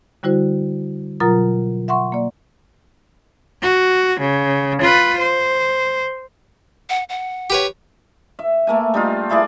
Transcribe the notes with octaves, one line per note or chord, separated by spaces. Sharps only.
D3 G3 E4 F#4 C5
B2 F#3 F4 A#4 A#5 A6
E5 F#5 C6 C#6
A#3 D5
F#4
C#3
F4 B4
C5
F#5
F#5
G4 B4 C#5
E5
A3 A#3 G#5
G3 D#4 F4
A3 E4 G#4 D5